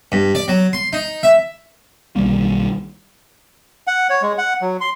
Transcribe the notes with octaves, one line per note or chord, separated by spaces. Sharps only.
G2
D5
F#3
C6
D#4
E5
B1 D#3 G3 A#3
F#5
C#5
G#3
F#5
F#3
C6